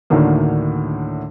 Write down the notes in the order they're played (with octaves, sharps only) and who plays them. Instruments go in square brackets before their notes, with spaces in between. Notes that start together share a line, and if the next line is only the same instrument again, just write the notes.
[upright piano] D2 A2 D3 D#3 A#3